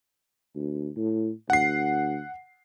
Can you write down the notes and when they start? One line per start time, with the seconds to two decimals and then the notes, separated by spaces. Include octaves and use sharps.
0.55 D2
0.97 A2
1.50 D2 F#5 C7